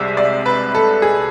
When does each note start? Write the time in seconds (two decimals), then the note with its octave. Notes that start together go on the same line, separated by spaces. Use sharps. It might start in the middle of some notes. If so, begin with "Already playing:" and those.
Already playing: C2 C3 G#3 D5 E5
0.17 D5
0.46 B4
0.75 A4
1.02 G#4